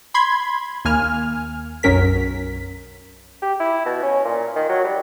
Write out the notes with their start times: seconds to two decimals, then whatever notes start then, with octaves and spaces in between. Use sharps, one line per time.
0.14 B5 C6 G#6
0.85 D#2 A#3 G#5 F6
1.83 B1 F#2 F#3 C#4 A#4 B6
3.42 G4
3.60 E4
3.85 B2
4.03 C#4
4.25 A#2
4.56 D#3
4.69 F#3
4.84 G3